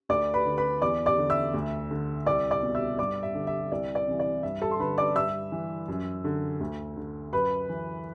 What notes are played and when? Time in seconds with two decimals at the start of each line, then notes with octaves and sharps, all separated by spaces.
0.09 D2 D5 D6
0.34 B4 B5
0.46 D3
0.57 B4 B5
0.82 E2 D5 D6
1.06 D5 D6
1.18 D3
1.30 E5 E6
1.54 D2
1.90 D3
2.26 C2 D5 D6
2.51 D5 D6
2.63 B2
2.75 E5 E6
2.98 G2 D5 D6
3.23 E5
3.35 D3
3.47 E5
3.72 C2 D5
3.95 D5
4.07 C3 E3
4.19 D5
4.43 G2 E5
4.62 A4 A5
4.71 C6
4.79 D3 B4 B5
4.98 D5 D6
5.15 G2 E5 E6
5.52 E3
5.88 F#2
6.24 D3
6.60 D2
6.97 D3
7.33 F#2 B4 B5
7.69 E3